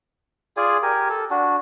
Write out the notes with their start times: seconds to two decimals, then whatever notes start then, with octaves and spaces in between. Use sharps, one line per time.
0.57 F4 G#4 D5 G#5
0.82 G4 A#4 G#5
1.09 A4
1.31 D4 F#4